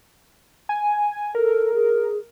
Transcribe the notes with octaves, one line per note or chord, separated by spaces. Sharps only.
G#5
A4 A#4
G#4